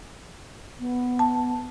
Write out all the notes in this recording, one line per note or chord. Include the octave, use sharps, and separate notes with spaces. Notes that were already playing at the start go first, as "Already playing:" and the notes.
B3
A5